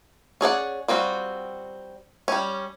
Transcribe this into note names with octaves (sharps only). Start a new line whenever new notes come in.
C#4 G#4 D5 F#5
G3 C4 F4 F#4
G3 C#4